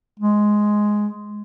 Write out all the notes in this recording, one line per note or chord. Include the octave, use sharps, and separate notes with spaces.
G#3